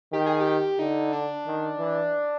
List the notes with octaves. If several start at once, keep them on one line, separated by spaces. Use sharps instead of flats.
D#3 G4
G#4
G4
D3 D#4
D4
D#3
E3